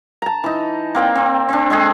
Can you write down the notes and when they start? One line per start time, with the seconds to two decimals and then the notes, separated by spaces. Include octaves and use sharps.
0.22 A5 A#5
0.44 E3 D#4
0.95 A#3 C4 D5 G5
1.15 C4
1.49 C4 D4
1.70 G#3 C4 G#4 A4